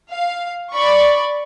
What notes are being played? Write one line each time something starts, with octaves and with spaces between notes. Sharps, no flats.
F5
D5 B5 C#6